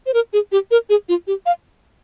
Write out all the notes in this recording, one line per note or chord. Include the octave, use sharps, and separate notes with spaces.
C5
A#4
G#4
G4
A#4
G#4
F4
G4
F5